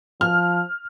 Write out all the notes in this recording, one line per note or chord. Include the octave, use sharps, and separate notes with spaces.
F3 F6